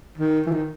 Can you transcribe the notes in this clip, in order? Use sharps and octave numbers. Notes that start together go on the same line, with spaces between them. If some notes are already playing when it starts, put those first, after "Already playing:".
D#3
E3
D#3